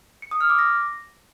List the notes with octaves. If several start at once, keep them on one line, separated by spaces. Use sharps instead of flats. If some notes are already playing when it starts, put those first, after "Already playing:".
C#7
D#6
F6
D6
A#6